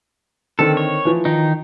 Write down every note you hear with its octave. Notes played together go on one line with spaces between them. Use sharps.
D3 D#3 C4 A4
C#5
E3 F3
D#3 D#4